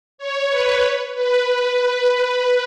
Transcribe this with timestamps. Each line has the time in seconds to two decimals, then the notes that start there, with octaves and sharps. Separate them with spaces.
0.18 C#5
0.50 B4
1.15 B4